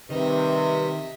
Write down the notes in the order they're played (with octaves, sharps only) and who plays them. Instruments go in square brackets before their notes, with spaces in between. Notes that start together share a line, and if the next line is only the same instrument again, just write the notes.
[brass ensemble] C3 [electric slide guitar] D#3 [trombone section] G3 G4 B4 [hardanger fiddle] D#5 E5